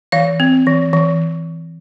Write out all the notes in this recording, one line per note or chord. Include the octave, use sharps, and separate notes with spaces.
E3 F5
C4
E3
E3